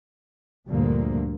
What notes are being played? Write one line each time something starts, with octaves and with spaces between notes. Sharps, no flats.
D2 G2 A#2 D3 F3 A#3